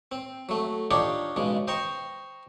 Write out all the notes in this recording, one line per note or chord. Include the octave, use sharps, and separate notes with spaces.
C4
F#3 A3
D4 D#4 F4 G4 C#5 D5
B1 C#3 G#3
C5 D#5 G5 A#5 C6 C#6